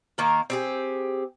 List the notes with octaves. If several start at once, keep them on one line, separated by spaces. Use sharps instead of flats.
D#3 A#3 A#4
C4 G4 G#4